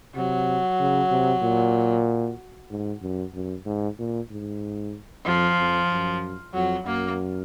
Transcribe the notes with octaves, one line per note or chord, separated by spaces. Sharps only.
C3 F#3
C#3
C3
A#2
G#2
F#2
F#2
G#2
A#2
G#2
F2 F3
F2
F#2
F2 F#3
F#2 A#3